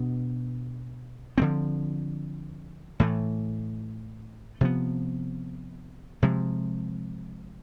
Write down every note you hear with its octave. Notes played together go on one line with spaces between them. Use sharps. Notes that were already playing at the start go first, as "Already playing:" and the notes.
Already playing: B2 B3 D4
D3 F3 A3 C4
A2 E3 A3
C3 F3 B3
C3 F3 G#3